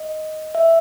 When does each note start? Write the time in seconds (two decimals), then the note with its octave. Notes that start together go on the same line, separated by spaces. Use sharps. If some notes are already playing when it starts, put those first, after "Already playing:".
Already playing: D#5
0.55 E5